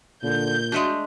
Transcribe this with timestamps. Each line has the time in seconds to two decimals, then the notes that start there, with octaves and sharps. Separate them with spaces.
0.23 A#2 D3 G6
0.72 G#3 A3 D4 F#4